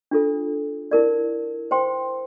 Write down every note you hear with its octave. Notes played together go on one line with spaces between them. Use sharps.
D4 F4 A4
E4 A#4 D5
C5 G5 C6